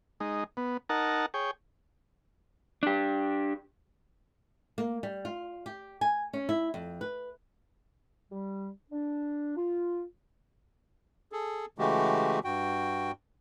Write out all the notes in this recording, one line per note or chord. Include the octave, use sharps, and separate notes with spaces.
G#3 D#4
B3
D#4 A#4 F#5 A5
G#4 C#5 G5
D4 G4
A#3
G3
F4
G4
G#5
C#4
E4
F2
B4
G3
D4
F4
G#4 A4
C#3 E3 G#3 A3 F#4 G4
G2 F#4 G5